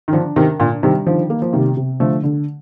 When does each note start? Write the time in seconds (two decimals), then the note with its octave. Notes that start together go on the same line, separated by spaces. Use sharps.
0.08 D#3
0.13 D3 F3 D4
0.36 C3 D#3 A#4
0.59 A#2 D3 D4
0.83 C3 D#3 G3
1.06 D3 D#3 F3
1.30 A#3
1.42 F3
1.53 C3 D#3 G3
1.77 C3
2.00 D3 F3 A3
2.23 D3